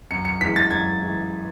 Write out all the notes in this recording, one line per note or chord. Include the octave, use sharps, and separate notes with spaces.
F#2 C#7
C#7
E3 G#3 B6
A6
F#2 G#6
E3 G#3